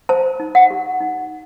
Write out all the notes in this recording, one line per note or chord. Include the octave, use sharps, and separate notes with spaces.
C5 A5
D#4
F#5
G4
D#4